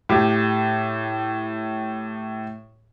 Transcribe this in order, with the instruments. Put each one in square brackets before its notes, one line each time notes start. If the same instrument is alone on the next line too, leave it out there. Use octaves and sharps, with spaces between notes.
[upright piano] A2 G4